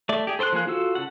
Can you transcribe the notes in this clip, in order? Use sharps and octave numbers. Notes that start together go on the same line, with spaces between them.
A3 D5
G4 G#4
A4 C5 C6 D6 F#6
F3 A#3 G#4 F#6
F4 F#4 A4 E6
C#3 A4 F#5